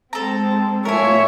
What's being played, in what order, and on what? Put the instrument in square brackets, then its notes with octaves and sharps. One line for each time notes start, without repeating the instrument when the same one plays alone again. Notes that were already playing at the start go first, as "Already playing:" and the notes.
[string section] G#3 C4 [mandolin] A4 A#5
[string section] A2 F4 [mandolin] A#4 G#5 [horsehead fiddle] C#5 E5